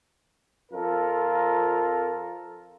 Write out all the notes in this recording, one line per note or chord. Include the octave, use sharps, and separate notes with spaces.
F2 F4 A4 A#4